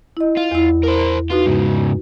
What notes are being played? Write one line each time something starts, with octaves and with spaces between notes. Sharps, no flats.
E4 D#5
F4
E2 E4
A#4 C5
D#4 F4 F#4 B4
G#2 C#3